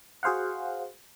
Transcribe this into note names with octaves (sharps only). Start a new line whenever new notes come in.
F#4 G#4 C5 F5 F#5